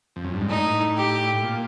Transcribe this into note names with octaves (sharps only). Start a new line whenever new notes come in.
F2
F#2
G2
G#2
A2 D#4
G4
A#2